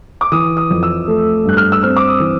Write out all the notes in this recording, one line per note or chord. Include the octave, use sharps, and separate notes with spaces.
D6
E3 D#6
D#6
F2
E6
A3
G2 F#6
F6
E6
C4 F6
D6
D#6
E3